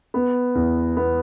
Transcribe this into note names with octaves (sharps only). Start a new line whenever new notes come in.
B3
E2
B3